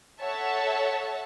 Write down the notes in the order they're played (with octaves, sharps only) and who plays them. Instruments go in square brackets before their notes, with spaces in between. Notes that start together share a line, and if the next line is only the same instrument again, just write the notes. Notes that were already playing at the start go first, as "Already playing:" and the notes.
[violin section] A4 C#5 E5 F#5 A5